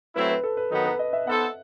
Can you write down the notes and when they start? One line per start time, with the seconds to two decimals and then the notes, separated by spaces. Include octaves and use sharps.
0.16 F#3 A3 C4 E4 B4
0.30 B4
0.44 A4
0.57 B4
0.71 D#3 F#3 B3 D#4 A4
0.85 B4
0.99 D#5
1.13 E5
1.27 B3 D#4 A4 C5 F#5